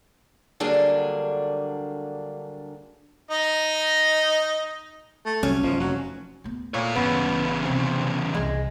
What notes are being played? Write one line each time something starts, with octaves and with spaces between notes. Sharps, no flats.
D3 F#3 G3 A#3 D4 G#4
D#4 D#5
A3
C2 F#3 G3 C#4
F#1 G#2 F3
F1 F#3
D1 B3
A#2 A3 C#5
G1 E2 C#3 B3
C3 F3 C4
C2 F2 G#3